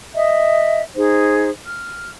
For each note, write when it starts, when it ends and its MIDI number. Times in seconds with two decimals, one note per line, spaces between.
0.15 0.82 75
0.15 0.82 76
0.96 1.49 63
0.96 1.49 68
0.96 1.49 72
1.65 2.10 89